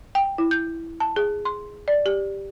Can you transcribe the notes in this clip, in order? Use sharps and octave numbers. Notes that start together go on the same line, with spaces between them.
G5
E4
G6
A5
G#4
C6
D5
G4